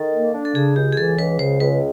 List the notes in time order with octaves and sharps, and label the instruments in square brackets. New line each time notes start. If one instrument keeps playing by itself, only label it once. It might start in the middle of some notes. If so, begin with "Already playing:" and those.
Already playing: [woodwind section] D#3 [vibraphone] A4
[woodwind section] A#3
D4
[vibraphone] A4
[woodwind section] C#3 [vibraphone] G#4
[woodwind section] C#2 [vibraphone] G4
[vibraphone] G#4
[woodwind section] E3 [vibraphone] A4
[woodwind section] C#2 [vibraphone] B4
[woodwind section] C#3 [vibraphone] C5
[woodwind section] C#2 [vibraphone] B4